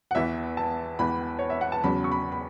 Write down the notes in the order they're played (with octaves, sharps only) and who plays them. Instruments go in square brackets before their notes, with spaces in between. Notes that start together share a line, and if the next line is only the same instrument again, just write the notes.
[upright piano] F#5
E2 E3 E5
A5
E2 E3 B5
C#5
E5
F#5
A5
E2 C#3 F#3 B5
C#6
B5
B5